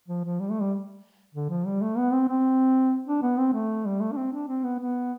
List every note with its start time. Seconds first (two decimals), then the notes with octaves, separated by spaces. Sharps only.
0.08 F3
0.24 F3
0.40 G3
0.51 A3
0.61 G3
1.35 D3
1.50 F3
1.66 G3
1.82 A3
1.97 B3
2.12 C4
2.28 C4
3.07 D4
3.22 B3
3.38 C4
3.53 A3
3.86 G3
4.00 A3
4.12 D4
4.17 C4
4.33 D4
4.48 C4
4.64 B3
4.80 B3